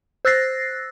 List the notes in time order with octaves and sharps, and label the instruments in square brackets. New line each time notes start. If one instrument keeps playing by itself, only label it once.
[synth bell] C5 E6 F#6 A6 A#6 C7